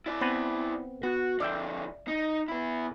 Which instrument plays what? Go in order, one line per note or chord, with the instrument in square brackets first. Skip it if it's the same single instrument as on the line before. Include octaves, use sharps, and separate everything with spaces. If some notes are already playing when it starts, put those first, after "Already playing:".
[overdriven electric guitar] E4 D5
[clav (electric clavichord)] B3 C4 B4
[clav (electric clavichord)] B3 [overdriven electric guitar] F#4
[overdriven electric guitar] D3 F3 [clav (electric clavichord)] D5 E5 G5
[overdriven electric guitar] D#4
B3 E4